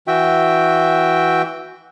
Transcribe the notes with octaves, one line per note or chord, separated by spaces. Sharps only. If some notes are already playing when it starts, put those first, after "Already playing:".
E3 F#4 E5 G5